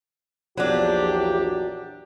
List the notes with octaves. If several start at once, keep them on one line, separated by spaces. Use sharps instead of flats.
A#1 E2 F#3 D4 G4